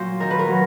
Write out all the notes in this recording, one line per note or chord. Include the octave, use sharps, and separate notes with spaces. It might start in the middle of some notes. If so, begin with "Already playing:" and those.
Already playing: A#2 F#3 C5
D#3 A#4
B4
A#4
F#3